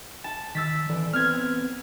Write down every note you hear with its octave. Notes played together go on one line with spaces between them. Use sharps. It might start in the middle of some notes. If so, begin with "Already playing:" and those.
A5
D#3 E6 A6 B6
E3 A4 D5
B3 C4 F6 G#6